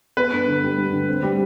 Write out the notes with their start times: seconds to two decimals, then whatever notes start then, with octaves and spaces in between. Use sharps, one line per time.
0.17 B3 B4
0.33 G2
0.48 D3
0.63 G3
0.78 G2
0.93 D3
1.08 C4
1.23 G3